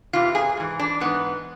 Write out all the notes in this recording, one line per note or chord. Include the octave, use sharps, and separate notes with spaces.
E2 C3 E3 F4
G#4
G#2 E3
D4
G#2 E3 B3